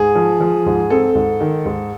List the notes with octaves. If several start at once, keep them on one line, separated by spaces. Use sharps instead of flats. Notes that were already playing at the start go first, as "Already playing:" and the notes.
Already playing: G#2 G#4
F3
F3
G#2
C4 A4
G#2
D#3
G#2